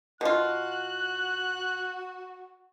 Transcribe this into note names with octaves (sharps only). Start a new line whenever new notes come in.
B2 F4 F#4 F#6